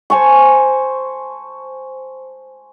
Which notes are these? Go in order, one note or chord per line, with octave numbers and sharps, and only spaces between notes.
C5 G#5 A5 C#6